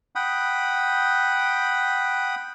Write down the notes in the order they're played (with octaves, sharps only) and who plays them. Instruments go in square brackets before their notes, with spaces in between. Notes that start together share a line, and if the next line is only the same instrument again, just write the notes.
[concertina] F#5 G5 B5 D#6